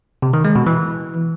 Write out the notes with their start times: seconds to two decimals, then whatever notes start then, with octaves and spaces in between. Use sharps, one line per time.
0.22 C3
0.33 D#3
0.45 G#3
0.56 B2
0.67 E3